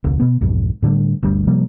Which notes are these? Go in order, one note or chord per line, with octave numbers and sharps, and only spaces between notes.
E1 C#2
B2 B3
B1 F2 G#2
A2 D3 D#3 G3
G1 D2 G3
C3 F3 G3 A#3